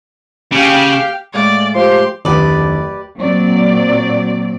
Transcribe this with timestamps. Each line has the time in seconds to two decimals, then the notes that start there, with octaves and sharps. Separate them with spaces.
0.52 C#3 G4 F5 G5
1.34 A2 G#3 D5 F5
1.75 F3 G4 C6
2.25 D1 F2 D3 D#3 G4 B4 D5 D6
3.20 A#2 F#3 C4 D5